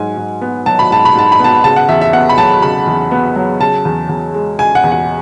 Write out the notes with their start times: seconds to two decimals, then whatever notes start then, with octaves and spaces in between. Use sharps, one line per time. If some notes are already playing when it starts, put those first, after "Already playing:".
Already playing: G#2 F#3 G#5
0.17 G#2
0.42 B3
0.66 F#3 A5
0.79 B5
0.90 G#2 A5
1.05 B5
1.15 G#2 A5
1.32 B5
1.39 B3 A5
1.64 C#3 A5
1.76 F#5
1.89 E2 E5
2.01 E5
2.13 B3 F#5
2.29 B5
2.38 F#3 A5
2.62 C#3 B5
2.87 E2
3.11 B3
3.36 F#3
3.60 C#3 A5
3.85 E2
4.09 E2
4.34 G#3
4.59 C#3 G#5
4.75 F#5
4.84 E2
4.92 F#5